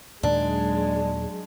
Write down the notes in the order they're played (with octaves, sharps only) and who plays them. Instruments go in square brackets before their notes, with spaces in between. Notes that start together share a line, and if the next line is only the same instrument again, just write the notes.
[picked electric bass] D#2 A#2 D#3 [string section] F#3 G#3 [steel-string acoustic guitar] D4